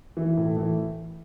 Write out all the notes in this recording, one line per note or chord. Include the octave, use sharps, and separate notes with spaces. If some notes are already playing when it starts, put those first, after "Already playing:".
E3
A2
E3